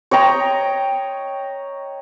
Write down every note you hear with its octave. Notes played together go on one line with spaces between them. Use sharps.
C#5 D#5 G5 A#5